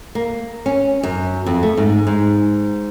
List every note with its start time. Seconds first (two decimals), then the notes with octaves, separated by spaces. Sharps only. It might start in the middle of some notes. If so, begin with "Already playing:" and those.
0.15 A#3
0.66 C#4
1.03 F#2
1.46 F2
1.63 A3
1.77 G#2
2.07 G#2